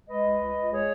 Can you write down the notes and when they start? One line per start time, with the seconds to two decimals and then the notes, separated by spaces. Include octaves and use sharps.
0.08 G#3 B4 D#5
0.24 C#2
0.40 C#2
0.56 C#2
0.71 G#3 G#4 C#5